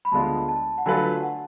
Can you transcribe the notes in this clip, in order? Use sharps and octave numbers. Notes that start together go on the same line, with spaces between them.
B5
D2 D3 G#3 B3 F4 A5
A5
F#5
D3 F#3 A3 F4 B4 G#5
F#5